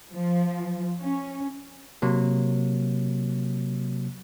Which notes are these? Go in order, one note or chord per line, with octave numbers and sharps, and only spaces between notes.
F3
C#4
C3 F#3 A#3